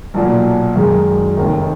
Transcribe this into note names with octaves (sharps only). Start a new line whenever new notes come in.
B1 A#2 F#3
F#2 D#3 G#3
F1 D#2 D#3